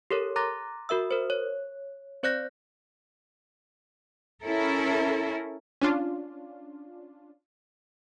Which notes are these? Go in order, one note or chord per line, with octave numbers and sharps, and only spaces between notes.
G4 A4 A#4 C#5
A#5 C6 D6 F#6 A6 A#6
F#4 A#4 E5 E6
A#4 C5
C#5
C4 C5 D5 F#6 G6 A#6
C#4 E4 A4 A#4
C#4 D4 F4